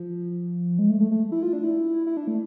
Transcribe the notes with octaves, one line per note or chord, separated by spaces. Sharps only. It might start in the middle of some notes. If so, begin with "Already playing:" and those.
Already playing: F3
G#3
A3
A3
A3
E4
F4
D4
E4
E4
D4
A3